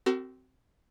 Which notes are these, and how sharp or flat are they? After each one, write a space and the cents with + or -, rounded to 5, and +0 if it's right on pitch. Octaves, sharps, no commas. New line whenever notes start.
C4 -10 F#4 +35 A#4 -45